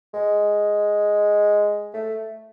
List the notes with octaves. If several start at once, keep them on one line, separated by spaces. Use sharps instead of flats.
G#3
A3